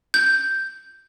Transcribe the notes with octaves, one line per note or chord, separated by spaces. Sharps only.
G6